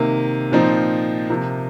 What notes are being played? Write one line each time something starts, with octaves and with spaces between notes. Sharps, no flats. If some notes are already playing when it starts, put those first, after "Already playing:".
Already playing: C3 D#3 A#3
A#2 F3 C4 D#4
C3 F3 A#3